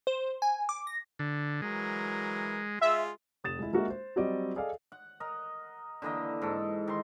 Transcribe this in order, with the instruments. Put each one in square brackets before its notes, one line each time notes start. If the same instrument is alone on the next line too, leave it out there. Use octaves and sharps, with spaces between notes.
[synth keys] C5
G#5
D6
A#6
[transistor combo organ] D3
[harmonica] E3 F#3 A#4 [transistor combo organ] G#3
[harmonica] G#3 F4 G#4 [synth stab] E5
[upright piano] F1 D#6 A6 E7
G#3 E4
G#3 A#3 D4 F#4 A#4 E5
C5
F#3 G3 C4 F#4 D5 D#5
G#4 A4 D5 D#5 F5
[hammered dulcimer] F#5
A#4 D#5
D3 E3 A#3 D#5
G#2 A4
D#3 C6